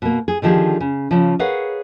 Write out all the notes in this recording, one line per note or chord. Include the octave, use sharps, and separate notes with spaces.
B2 A#3
G#4
D3 D#3 F3 G4 G#4
C#3
C#3 F3
G#4 A#4 B4 C#5 F5 F#5